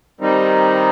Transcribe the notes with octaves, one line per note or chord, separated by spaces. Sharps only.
D#3 G3 C4 D#4